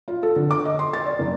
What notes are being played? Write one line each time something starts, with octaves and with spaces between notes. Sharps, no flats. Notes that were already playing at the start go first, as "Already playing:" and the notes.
F4
A4
D3
D6
D#5
C6
A6
D5
F#1